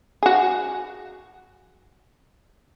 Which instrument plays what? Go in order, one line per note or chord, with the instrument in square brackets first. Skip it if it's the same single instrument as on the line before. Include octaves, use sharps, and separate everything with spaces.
[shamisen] F#4 G#4